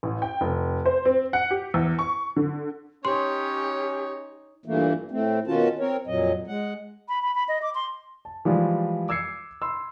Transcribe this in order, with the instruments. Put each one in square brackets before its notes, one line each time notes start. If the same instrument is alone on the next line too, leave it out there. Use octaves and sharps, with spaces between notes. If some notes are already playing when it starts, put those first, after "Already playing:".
[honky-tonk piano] A1
G5
F1
C5
C4
F#5
G4
E2
C#6
D3
[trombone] C#4 [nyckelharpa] D#4 C#5 [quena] G4 [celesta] C6
[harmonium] G2 A#2 E3 A3 A#3
A2 A3 C4
B2 D#3 C#4 F4 F#4 A5
C4 A#4 C#5
F2 A#2 F#3 D#5
G#3 F#5
[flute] B5
B5
B5
D#5
D6
C6
[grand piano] A5
E3 F3 G3 G#3 F4
D6 E6 G#6 C7 C#7
B5 C6 E6